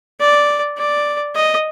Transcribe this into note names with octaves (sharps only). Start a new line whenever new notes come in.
D5
D5
D#5